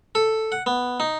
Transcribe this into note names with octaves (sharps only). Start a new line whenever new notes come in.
A4
F#5
B3
D#4